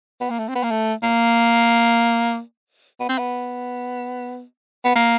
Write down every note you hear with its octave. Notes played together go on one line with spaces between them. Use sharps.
B3
A#3
A3
C4
B3
A#3
A3
A#3
B3
C4
B3
B3
A#3